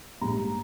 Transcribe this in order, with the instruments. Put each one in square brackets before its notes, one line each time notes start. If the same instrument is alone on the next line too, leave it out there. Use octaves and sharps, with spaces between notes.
[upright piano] A#1 G#2 G3 A#5